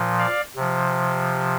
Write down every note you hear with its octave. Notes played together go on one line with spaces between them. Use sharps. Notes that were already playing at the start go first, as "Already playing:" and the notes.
Already playing: A#2 F3
D5 F5
C3 F3